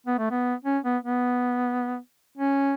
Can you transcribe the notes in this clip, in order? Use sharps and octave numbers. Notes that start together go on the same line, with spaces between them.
B3
A3
B3
C#4
B3
B3
C#4